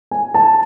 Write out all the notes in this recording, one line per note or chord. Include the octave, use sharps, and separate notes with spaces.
G#5
A5